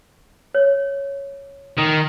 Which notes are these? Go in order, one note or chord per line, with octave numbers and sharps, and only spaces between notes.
C#5
D#3